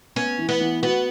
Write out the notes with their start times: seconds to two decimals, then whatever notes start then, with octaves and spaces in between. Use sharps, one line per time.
0.16 B3 C#4
0.38 E3
0.49 B3
0.60 E3
0.82 B3 F#4